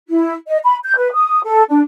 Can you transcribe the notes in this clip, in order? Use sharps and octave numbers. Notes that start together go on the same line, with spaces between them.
E4
D#5
B5
G6
B4
D#6
A4
D4